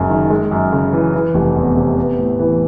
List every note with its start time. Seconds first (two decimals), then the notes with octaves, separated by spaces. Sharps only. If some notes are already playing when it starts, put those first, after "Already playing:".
Already playing: F#1 F#2 G#3
0.10 D#3
0.30 G#3
0.51 F#2
0.73 C#3
0.93 E3
1.14 E3
1.34 F1
1.56 E2
1.77 C3
1.98 B3
2.19 A2
2.39 E3